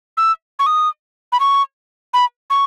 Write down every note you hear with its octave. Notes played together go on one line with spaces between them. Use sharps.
E6
C#6
D#6
B5
C#6
B5
C#6